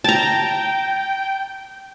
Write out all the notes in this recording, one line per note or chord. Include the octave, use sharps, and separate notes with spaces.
G5 A5 A#5